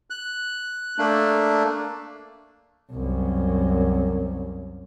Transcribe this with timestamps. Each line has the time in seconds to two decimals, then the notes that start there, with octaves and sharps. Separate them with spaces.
0.10 F#6
0.98 A3 A#3 D4
2.91 C2 F#2